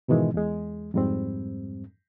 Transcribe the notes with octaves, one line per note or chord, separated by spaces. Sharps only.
G#2 B2 D#3 E3 G#3
E2 G#3
F2 G#2 G3 C4